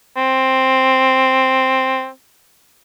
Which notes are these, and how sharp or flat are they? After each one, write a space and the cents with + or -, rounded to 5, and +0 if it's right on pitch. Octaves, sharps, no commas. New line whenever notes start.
C4 +5